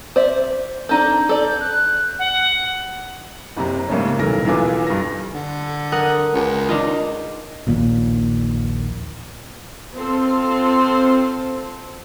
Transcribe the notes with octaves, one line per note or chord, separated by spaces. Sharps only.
C5 D5 E5
D4 D#4 A4 G6
A4 D5
F#6
F#5
F#1 C3 A#5
G#2 C#3 A3 A#3 C#4
D#1 B1 E3 A#4 A#6
B1 E3 F4 B4 G#5 D6
G2 A#6
D3
A#4 F#5 D#6
C#2
D4 D#4 F4
A#1 D#2 A#2
C4 F4 A4 C5 C6